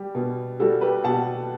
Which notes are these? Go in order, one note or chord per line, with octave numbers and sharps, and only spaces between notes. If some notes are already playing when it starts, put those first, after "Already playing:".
Already playing: G3 G4
B2
G3 F#4 A4
G4 B4
B2 F#5 A5